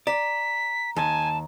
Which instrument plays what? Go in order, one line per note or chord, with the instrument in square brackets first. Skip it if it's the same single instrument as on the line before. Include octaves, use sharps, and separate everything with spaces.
[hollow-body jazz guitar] D5 [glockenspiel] A#5 [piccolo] B6
[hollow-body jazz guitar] D#2 [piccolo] G#5 [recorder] A5